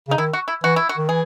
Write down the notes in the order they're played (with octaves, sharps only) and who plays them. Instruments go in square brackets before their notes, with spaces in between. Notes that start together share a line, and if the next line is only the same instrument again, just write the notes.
[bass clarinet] C#3 [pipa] D#4
[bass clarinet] D#3 [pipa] E4
[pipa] F#4
E4
[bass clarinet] E3 [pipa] F#4
[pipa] E4
F#4
[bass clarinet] D#3
[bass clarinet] E3 [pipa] G#4